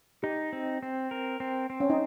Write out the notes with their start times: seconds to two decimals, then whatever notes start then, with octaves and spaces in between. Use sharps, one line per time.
0.23 D#4 G4
0.53 C4
0.83 C4
1.11 A#4
1.40 C4
1.70 C4
1.80 C#4
1.90 D#4